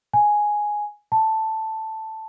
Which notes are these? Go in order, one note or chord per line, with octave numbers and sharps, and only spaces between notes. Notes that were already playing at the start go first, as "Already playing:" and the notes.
G#5
A5